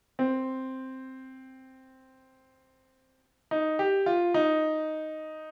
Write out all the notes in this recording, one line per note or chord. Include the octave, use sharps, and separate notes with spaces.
C4
D#4
G4
F4
D#4